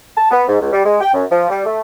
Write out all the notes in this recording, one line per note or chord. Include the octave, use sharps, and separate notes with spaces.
A5
B3
G#2
C#2
G3
G#3
G5
F#2
F3
G3
A3